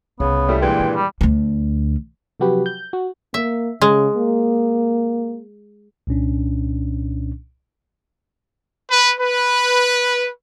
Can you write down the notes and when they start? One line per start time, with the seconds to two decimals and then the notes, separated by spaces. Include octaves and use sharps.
0.20 C2 C#3 B3
0.49 G3 A3 E4
0.61 G2 A#2 E3 G#3 G5
0.80 D#3
0.95 G3
1.21 D2 D3
2.40 C3 F3 F#3 F#4 G4 B4
2.66 G6
2.93 F#4
3.34 A#3 E5
3.82 C#3 G#3
4.17 A#3
6.07 C2 A#2 C#4 D4
8.91 B4
9.20 B4